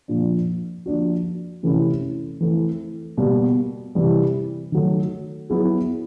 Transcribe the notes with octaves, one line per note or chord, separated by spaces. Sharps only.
A#2 F3 A#3 D4
F3 A#3 D4 F#4
C3 E3 A3 C#4 E4
E3 A3 C4
B2 G3 A#3
C3 E3 G3
D#3 F#3 A3
F#3 B3 E4 G#4